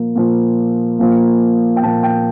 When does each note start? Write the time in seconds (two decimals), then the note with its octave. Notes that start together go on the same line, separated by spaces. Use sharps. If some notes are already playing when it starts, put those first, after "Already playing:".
Already playing: A#2 F3 A#3
0.16 A#2 F3 A#3
0.99 A#2 F3 A#3
1.76 G5
1.82 A#2 F3 A#3 A5
2.03 G5